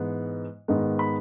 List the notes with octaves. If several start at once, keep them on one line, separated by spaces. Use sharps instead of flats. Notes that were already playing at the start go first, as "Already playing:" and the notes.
Already playing: G#2 E3 G#3 B3
G#2 D#3 G#3 B3
B5